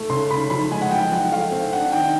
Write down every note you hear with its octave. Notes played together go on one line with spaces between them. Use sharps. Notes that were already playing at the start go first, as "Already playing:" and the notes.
Already playing: A3
C#3 C6
C#3 B5
F3 B5
G#3 G#5
F#5
F3 G5
F3 F#5
A3 F5
C4
D4 F#5
D#3 G5